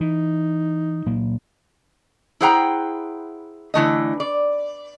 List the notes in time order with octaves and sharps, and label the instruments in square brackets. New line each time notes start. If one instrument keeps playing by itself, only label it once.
[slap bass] E3 [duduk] D#4
[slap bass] A#2 F#3 A#3
[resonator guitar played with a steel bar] E4 G#4 C5 F#5 G5 A#5
D3 E3 A3 D#5
D5